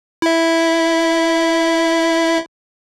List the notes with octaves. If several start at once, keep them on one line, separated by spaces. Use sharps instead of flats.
E4 E5